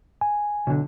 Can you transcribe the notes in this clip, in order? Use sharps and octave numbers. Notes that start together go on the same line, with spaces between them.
G#5
B1 D3